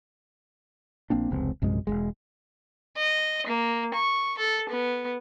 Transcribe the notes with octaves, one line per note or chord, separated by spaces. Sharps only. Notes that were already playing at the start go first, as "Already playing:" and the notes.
A#1 A#3 C4 D4
F1 C#2 C4
A#1 F#2 C3 G#3
E1 E2 G#3
D#5
A#3
C#6
A4
B3